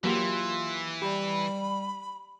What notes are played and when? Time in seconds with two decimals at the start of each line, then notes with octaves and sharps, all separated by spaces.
0.04 E3 F#3 A#3 F4 G4
1.02 G3 G4 B5